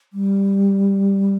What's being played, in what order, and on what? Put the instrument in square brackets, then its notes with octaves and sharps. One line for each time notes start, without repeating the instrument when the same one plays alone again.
[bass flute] G3